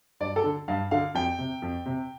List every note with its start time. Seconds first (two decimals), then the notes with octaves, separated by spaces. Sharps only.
0.20 G2 D5
0.36 A4
0.44 D3
0.68 G2 F5
0.91 D3 F5
1.14 F2 G5
1.38 C3
1.62 F2
1.86 C3